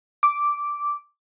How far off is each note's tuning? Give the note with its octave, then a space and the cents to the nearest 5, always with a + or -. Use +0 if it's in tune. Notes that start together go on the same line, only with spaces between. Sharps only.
D6 -5